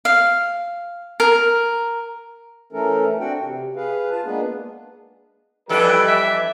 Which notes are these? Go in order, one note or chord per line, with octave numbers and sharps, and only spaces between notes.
F5
A#4
E3 A3 C#4 A4 A#4
C4 D4 F#4 F#5 G5
C3
G#4 B4 F5
F4 A5
G#3 A#3 B3 D4 G#4 B4
F2 E3 G3 D4 A4 B4
E5